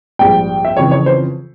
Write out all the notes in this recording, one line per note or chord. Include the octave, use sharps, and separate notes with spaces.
A#1 G#2 G3 G5
E5
F2 C#3 E3 C#5
C#5
C5